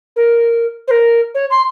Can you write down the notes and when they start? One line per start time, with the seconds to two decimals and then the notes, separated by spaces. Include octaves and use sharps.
0.15 A#4
0.87 C5
0.90 A#4
1.34 C#5
1.50 C6